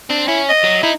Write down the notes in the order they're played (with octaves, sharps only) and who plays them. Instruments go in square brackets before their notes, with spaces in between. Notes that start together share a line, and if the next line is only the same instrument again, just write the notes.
[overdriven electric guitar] C4 [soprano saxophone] D4
[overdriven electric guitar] C#4 [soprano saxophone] E4
[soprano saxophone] D#5
[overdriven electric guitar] F#3
[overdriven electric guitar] D#4 [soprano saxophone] E4